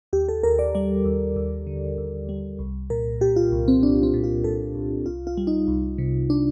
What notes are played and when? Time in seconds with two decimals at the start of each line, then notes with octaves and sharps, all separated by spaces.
0.13 D#2 G4
0.29 A4
0.43 D#2 A#4
0.59 D5
0.75 G3 D5
1.05 D#2
1.36 D#2
1.67 D3
1.98 D#2
2.29 G3
2.59 C2
2.90 A#2 A#4
3.21 A#2 G4
3.36 F4
3.52 C2
3.68 C4
3.83 C2 D4
4.03 C4
4.14 A#2
4.24 F4
4.44 A#2 A4
4.75 C2
5.06 C2 F4
5.27 F4
5.37 G3
5.47 D#4
5.68 C2
5.98 C3
6.30 D4